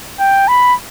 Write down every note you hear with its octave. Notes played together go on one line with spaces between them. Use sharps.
G5
B5